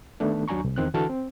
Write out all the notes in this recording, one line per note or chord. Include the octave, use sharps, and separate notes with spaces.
D#3 A3 B3 D4
D#2 F#3 D4 G#5 A#5 C#6
C2
E2 D#3 C4 F#6
D3 E3 F#4 A4 A5 F6
C4